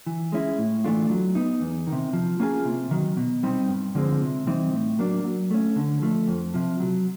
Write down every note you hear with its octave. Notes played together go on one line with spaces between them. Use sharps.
E3
G#3 C#4 E4
A2
E3 A3 D4 F4
F#3
B3 D#4
E2
D#3
C3
F3
A#3 C#4 F4 G#4
C3
D#3 F#3
B2
G3 C4 D#4
G2
D3 F3 G#3 C4
C3
E3 G3 C4 D#4
A2
F#3 A#3 D4
F#3
A3 C#4
D3
F3 A3
F2
C3 F3
F#3